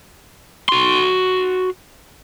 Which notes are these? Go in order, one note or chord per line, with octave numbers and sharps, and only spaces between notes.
F#4 C6